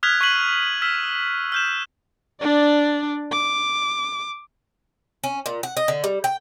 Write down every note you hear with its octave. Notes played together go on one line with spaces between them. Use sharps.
D#6 F6 F#6 G#6 B6 F7
C#6 F#6 B6 C7 D#7 F#7
E6 F6 G#6 B6 E7
F6 G6 E7
D4 D5
D6
C#4
A#2
F#5
D#5
D3
G3
G5